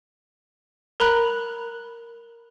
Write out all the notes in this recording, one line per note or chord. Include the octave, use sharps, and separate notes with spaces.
A#4 A#5 B5 F#6